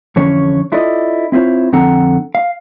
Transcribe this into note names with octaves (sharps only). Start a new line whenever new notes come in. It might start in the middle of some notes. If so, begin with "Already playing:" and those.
F2 D3 E3 C#4 C#5
D4 E4 F4 A4 D5 D#5
C4 E4 F4 C5 C#5
F2 D3 C4 A4 F#5 A#5
F5